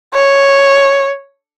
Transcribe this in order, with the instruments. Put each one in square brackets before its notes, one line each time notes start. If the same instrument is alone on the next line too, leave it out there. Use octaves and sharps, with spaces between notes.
[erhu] C#5